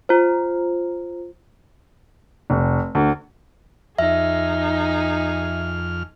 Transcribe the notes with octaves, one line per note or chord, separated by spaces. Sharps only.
F4 C5
F1
D2
F2 D#4 G#4 E5 F6